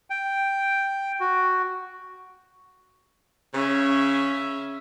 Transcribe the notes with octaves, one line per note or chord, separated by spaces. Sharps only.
G5
F#4
C#3 C#4 E5